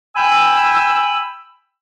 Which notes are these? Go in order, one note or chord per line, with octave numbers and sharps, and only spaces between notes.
G5 G#5 B5 E6